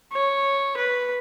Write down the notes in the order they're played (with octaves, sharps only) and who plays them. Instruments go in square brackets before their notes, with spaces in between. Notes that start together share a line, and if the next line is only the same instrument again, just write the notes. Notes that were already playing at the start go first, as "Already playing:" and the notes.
[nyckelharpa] C#5
B4